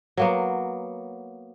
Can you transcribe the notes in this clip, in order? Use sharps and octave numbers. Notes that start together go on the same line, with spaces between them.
F#3 A#3 B3